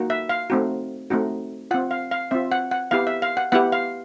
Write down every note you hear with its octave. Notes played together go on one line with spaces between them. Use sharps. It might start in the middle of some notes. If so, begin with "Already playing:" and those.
Already playing: A#3 D#4 F#4
E5
F5
A3 C4 D#4 F#4
A3 C4 D#4 F#4
C4 F4 F#5
F5
F5
C4 F4 E5
F#5
F#5
B3 E4 G4 F5
E5
F5
F#5
B3 E4 G4 F#5
F5